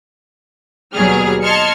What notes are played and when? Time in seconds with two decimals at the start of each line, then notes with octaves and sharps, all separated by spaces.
0.93 D#2 B2 F#3 G3 G#4 F6
1.42 D#5 A5 C6 F6 G#6 C#7